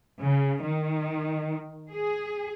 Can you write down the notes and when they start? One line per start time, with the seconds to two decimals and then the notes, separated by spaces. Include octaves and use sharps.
0.20 C#3
0.63 D#3
1.91 G#4